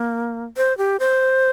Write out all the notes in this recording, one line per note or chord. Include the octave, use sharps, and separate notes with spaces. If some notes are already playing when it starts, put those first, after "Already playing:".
Already playing: A#3
C5
G4
C5